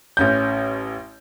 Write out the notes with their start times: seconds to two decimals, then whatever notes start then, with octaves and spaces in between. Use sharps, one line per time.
0.17 A1 C#4 G6